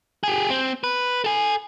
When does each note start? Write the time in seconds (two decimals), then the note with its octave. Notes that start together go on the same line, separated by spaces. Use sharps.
0.23 G4 G#4
0.50 C4
0.84 B4
1.24 A4 G#5